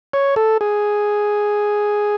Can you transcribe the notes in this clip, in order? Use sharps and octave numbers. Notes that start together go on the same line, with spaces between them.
C#5
A4
G#4